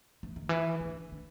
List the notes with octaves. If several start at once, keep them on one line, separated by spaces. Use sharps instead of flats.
E3
D#3
E3
C#3
D3
D3